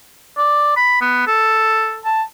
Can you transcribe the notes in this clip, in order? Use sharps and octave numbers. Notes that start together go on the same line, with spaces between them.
D5
B5
B3
A4
A5